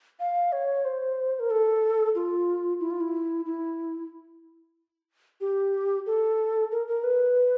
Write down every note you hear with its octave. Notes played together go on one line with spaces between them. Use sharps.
F5
C#5
C5
A#4
A4
F4
E4
F4
E4
E4
G4
A4
A#4
A#4
B4